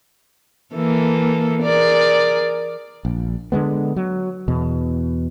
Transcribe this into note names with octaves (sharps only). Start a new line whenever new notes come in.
E3 A#3 A4
G#4 A#4 D5
A#1
D3 F#3 G#3 B3
F#3
E2 B2